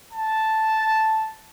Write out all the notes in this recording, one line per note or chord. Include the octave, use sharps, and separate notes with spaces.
A5